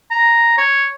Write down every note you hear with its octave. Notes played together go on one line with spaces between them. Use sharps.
A#5
C#5